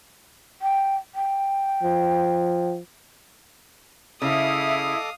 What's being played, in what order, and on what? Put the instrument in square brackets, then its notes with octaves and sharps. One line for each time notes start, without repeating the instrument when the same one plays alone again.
[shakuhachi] G5
G5
[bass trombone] F3
[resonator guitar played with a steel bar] C#3 [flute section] E4 [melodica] A4 D#5 D6 [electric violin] F5 D#6